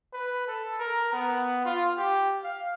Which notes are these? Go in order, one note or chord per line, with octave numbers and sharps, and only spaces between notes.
B4
A4
A#4
B3
F4
G4
F5